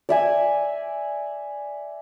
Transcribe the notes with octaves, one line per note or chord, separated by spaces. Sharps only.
D5 E5 G#5